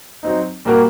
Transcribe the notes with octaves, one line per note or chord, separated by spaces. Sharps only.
F#3 C4 D#4
A#2 G3 A#3 F#4 A#4